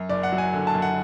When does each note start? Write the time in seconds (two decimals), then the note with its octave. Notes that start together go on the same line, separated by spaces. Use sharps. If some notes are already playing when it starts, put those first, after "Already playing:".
Already playing: F#2
0.09 F#1 D5
0.23 F#5
0.32 F#3
0.38 G#5
0.54 D3
0.67 A5
0.75 F#2
0.82 F#5